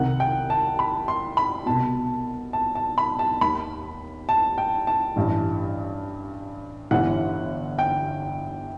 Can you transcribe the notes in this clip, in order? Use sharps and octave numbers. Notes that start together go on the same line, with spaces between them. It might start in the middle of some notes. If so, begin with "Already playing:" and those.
Already playing: C2 C3 D#3 F#5
G5
A5
B5
C6
B5
C2 B2 A5
A5
A5
B5
A5
D#2 D#3 B5
A5
G5
A5
A1 G2 E3
G1 G2 E3 F#5
G5